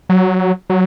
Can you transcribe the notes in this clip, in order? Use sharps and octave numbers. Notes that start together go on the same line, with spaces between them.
F#3
F#3